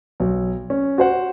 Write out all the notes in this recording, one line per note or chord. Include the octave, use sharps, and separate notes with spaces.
B1
C#4
F#4 C5 F#5